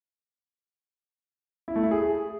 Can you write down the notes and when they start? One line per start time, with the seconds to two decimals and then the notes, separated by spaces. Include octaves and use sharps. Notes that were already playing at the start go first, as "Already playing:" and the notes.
1.68 E4
1.76 A3
1.83 E4
1.91 G#4